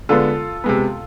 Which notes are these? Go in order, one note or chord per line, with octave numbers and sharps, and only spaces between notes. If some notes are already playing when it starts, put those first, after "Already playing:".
D3 G#3 B3 F4 A4
C3 G#3 B3